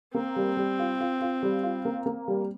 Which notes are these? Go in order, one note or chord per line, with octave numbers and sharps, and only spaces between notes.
A#3 C4
G3
G3
F4
F4
F4
G3
F4
A#3
A#3
G3